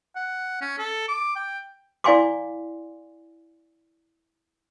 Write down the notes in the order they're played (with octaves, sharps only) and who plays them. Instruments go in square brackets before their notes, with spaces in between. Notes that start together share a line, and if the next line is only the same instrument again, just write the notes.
[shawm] F#5
C#4
A4
D6
G5
[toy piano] E4 D5 F5 G#5 C6 D6